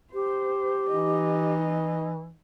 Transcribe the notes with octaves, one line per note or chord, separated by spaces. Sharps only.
G4 C5
E3 D#4 D#5